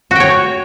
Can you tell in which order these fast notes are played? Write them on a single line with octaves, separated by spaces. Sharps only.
F#4 G5 C#5